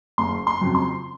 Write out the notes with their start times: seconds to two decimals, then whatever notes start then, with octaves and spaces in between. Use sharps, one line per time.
0.18 F#1 C6
0.47 C6
0.61 F2 C#3 F#3 C4
0.75 C6